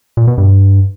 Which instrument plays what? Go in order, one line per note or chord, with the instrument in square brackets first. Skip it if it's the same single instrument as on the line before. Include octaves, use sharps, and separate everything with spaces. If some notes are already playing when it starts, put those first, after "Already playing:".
[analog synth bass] A#2
B2
G2